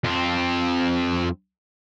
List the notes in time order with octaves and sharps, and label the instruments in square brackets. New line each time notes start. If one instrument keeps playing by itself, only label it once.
[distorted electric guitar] F2 C4